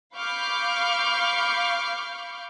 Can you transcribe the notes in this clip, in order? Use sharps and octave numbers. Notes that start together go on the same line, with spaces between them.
F5 B5 C#6 D6 F6 G6